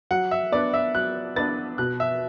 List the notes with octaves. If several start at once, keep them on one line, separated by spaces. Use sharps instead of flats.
F#3 F#5
E5
B3 D4 B4 D5
E5
F#3 F#6
B3 D4 B4 A6
B2 F#6
E5